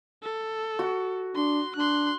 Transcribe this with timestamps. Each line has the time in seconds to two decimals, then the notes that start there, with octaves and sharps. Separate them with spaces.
0.23 A4
0.79 F#4
1.36 D4 C6
1.76 D4 C6 F#6